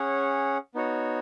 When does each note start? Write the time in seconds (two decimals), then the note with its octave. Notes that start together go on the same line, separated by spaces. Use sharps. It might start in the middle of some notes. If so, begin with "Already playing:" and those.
Already playing: C#4 G#4 C#5 F#5
0.75 B3 D#4 F#4 C#5